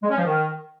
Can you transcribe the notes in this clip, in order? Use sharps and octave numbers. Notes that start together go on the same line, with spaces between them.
G#3
C#4
F3
D#3